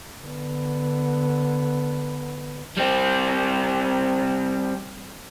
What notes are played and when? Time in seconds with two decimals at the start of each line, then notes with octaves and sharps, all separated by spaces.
0.22 D3 B3
2.77 G3 C4